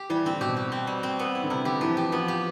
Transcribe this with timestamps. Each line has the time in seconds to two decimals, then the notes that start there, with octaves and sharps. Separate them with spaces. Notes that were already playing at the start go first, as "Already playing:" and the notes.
Already playing: G4
0.10 E3 G3
0.25 D3 C4
0.41 B2 G4
0.57 G4
0.72 C4
0.87 G3
1.03 C4
1.19 B3
1.35 E4
1.44 D3
1.50 C3 E4
1.65 D3 G4
1.81 E3 F3
1.97 G4
2.12 F3 B3
2.28 G4